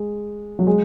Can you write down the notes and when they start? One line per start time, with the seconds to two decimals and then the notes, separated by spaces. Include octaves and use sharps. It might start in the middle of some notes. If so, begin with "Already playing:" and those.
Already playing: G#3
0.59 F#3
0.67 G#3